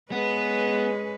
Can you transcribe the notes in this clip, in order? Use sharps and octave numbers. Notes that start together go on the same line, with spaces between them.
G#3 B3 C#4 B4